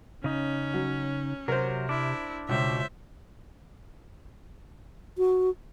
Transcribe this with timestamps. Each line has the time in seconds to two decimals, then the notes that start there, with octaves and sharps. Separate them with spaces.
0.24 C#3 C#4 D#4
0.74 F#3
1.48 C3 F#3 A#4 C5
1.89 D4 E4
2.49 C#2 B2 C5 E5
5.18 F#4